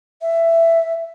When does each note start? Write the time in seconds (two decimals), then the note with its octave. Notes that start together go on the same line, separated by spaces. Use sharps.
0.22 E5